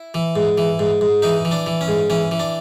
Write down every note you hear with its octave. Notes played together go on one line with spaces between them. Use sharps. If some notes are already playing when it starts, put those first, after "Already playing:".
Already playing: E4
E3
G#2
E3
G#2
G#2
E3 D#4
E3
D4
E3
C#4
G#2
E3 C#4
E3
D4